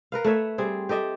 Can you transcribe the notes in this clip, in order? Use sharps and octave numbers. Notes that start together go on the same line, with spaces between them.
A#4 B4 F5
A3 B4 C#5 E5
G3 C4 G#4
G4 A4 D#5 E5